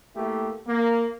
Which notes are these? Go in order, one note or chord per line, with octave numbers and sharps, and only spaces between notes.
A3 A#3 E4 G4
A#3